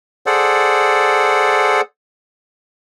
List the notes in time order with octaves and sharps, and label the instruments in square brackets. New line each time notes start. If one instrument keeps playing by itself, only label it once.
[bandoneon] G#4 A4 C5 D5 F#5